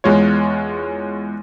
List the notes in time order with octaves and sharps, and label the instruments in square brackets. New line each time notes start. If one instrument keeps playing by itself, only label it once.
[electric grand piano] E2 G#3 F4 C#5